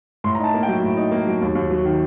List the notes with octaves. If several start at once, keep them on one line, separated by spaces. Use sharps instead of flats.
A2 C6
A#5
D#4 A5
A#3
G5
F#3
A2
D#4
A#3
F#3
D#2
D#2
F#3
D#3